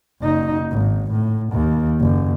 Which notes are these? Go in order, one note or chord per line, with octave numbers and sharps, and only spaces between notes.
F#1 D#4
G#1
A2
D#2
F#1 F#2